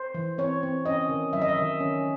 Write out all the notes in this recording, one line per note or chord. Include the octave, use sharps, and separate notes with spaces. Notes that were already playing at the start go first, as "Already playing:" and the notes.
Already playing: C5
E3
C4 C#5
C4
C#4 D#5
D#3
F#3 E5
D#5
E5
D#3
C#4